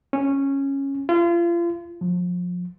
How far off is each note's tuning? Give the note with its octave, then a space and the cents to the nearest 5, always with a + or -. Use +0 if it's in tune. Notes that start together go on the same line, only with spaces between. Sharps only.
C#4 -10
F4 -35
F3 +30